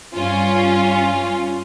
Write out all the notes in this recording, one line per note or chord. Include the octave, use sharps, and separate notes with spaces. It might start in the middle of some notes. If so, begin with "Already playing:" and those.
G2 C#4 F4